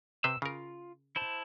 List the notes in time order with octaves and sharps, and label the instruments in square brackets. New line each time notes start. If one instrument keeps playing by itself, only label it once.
[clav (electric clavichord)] C3 B4 C5 [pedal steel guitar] E6
[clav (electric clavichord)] C#3 A#4 [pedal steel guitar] F4
[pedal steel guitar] E4 C5 A5